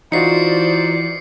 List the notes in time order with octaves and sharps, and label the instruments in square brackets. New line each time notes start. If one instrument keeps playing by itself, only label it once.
[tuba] E3 [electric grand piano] D#4 F4 F#4 [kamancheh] C5 D5 [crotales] C7 C#7